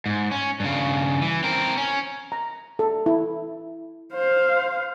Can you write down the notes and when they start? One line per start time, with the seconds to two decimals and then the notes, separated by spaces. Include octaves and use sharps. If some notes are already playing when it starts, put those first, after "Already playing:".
0.06 G#2
0.31 C#4
0.60 G2 C#3
1.21 E3
1.43 C4 A#4
1.77 C#4
2.32 A#5
2.79 A4
3.06 E4
4.13 C5 F5